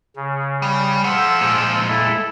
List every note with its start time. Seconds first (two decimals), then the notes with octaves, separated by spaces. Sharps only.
0.16 C#3
0.62 G3
1.04 F3 C5 F#5 E6
1.40 A#2 G#3
1.88 E4 A4